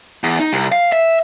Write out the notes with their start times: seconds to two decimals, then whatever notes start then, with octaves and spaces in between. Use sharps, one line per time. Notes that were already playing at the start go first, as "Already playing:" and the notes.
0.24 E2
0.40 D#4
0.53 C2
0.72 F5
0.92 E5